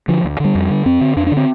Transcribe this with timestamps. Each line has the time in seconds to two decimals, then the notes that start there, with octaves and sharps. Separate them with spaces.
0.08 D3 F3
0.24 D2
0.40 D3 G3
0.55 F2
0.70 D3
0.85 F2 C4
1.01 D3
1.16 F2 D4
1.27 D4
1.32 D3
1.37 C4